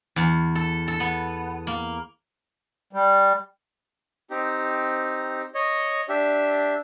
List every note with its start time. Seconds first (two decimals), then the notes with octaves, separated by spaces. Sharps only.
0.16 E2
0.55 A4
0.88 A4
1.00 B3
1.67 A#3
2.93 G3
4.30 C4 D#4 G4
5.55 C#5 D#5
6.09 D4 G4 E5